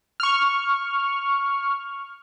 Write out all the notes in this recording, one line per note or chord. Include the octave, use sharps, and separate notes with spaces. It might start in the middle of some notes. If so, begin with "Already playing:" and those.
C#6 F6